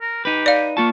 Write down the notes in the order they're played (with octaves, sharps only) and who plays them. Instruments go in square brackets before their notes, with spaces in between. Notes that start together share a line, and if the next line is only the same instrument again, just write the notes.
[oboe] A#4
[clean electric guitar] D#4 B4 [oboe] G4
[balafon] D5 F5
[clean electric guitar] A#3 F4 A5 [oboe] C#6